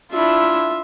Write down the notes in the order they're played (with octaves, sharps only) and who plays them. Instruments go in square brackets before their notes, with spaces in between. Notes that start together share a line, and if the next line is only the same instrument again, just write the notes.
[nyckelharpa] D4 E4 [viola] F4 E5